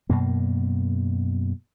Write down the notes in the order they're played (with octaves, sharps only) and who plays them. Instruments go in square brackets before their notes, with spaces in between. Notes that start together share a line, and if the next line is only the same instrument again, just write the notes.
[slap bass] F#2 B2 A#3